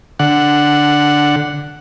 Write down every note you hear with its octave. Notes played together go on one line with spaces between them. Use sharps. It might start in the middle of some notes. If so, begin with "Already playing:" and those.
D3 F#5